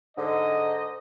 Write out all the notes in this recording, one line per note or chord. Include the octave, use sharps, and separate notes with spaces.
G#2 D3 D#5